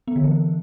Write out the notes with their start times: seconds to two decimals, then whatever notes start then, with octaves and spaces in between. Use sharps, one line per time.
0.08 B3
0.16 D3
0.24 E3